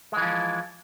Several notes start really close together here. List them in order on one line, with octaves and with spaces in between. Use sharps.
G#3 E3 F3